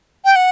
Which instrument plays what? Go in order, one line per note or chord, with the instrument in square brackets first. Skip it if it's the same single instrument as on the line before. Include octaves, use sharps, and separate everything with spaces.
[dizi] G5
F#5